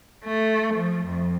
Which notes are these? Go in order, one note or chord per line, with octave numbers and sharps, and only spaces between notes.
A3
F3
F2